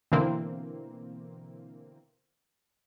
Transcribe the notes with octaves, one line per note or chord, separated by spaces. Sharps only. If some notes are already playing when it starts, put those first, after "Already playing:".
B2 D3 E3 A#3 C4